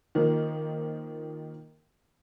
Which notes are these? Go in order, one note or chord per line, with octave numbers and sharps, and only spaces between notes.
D#3 F3 A#3